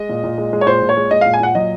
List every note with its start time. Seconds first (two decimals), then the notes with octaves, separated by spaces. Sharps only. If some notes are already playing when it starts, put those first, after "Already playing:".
Already playing: G#3 D#5
0.09 A#2
0.23 A#2
0.38 G#3
0.53 G#3
0.61 C#5
0.66 A#2 C5
0.82 A#2
0.89 C#5
0.97 G#3
1.11 G#3 D#5
1.21 A#2 F5
1.34 G#5
1.40 A#2 F#5
1.55 F#3 D#5